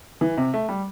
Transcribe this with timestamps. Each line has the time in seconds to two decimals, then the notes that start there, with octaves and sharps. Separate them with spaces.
0.21 E3
0.37 C3
0.53 A3
0.69 G3